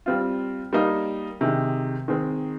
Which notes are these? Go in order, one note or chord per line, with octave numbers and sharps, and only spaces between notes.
G3 C4 F4
G3 A#3 D#4
C3 D#3 G#3
D#3 G#3 C4